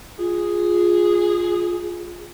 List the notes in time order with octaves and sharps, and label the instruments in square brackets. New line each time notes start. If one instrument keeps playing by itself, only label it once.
[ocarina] F4 [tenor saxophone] G#4